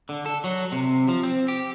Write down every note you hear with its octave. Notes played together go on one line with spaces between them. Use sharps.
D3
A4
F#3
C3
F3
C4
G4